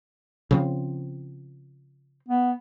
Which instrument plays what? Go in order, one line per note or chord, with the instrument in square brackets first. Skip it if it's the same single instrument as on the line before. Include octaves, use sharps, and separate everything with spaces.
[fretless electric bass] C#3 F3 C4
[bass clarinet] B3